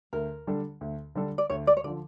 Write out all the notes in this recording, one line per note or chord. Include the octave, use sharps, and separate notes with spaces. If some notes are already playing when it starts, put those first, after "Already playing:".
D2 A#4
D3 G3 D4 A4
D2
D3 G3 D4 A4
D5
D2 C#5
D5
C#5
D3 F3 D5